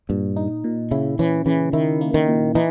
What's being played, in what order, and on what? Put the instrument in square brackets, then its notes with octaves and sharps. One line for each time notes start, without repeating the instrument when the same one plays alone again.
[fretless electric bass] G2 [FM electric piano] A#2
[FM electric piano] D#4
A#2
[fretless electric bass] C#3 [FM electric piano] E4
[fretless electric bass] E3 [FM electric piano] C#4
[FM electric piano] C#3 [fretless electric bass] E3
[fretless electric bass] D#3 [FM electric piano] E4
[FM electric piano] A#3
[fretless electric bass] D#3
[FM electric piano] A#2
[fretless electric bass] E3 [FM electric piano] D#4